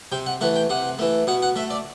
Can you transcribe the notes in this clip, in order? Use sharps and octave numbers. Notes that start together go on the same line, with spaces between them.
C3 G5
F#5
E3 A3 F#5
G5
C3 F#5
E3 A3
B2 F#5
F#5
A3 E5
D5